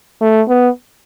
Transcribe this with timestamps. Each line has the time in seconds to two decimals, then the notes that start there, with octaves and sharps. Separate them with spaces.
0.21 A3
0.49 B3